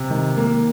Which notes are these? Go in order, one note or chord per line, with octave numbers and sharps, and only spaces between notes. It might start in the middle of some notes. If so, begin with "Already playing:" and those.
Already playing: C3
D#3
A#3